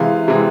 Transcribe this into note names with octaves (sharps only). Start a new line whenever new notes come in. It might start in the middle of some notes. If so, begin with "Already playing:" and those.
Already playing: C3 E3 G#3 F5
C3 E3 G#3